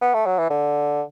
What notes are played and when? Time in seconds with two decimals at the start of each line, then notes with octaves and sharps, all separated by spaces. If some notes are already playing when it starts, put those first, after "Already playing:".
0.01 B3
0.14 A3
0.26 F#3
0.38 E3
0.50 D3